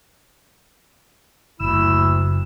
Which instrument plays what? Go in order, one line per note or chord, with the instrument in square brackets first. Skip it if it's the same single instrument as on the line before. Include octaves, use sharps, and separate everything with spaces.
[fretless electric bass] F#1 [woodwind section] D2 E4 E6